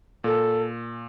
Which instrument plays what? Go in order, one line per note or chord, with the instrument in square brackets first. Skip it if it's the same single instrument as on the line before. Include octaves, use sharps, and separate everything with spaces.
[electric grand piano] A#2 [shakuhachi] A4